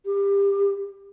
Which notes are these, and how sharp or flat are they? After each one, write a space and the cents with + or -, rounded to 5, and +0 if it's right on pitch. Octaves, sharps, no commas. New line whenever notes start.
G4 +25